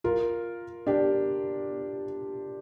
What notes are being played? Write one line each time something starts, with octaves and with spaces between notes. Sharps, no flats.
F4 A#4
D4 G4